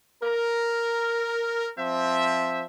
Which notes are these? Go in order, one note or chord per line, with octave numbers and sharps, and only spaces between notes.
A#4
F3 C4 C5 E5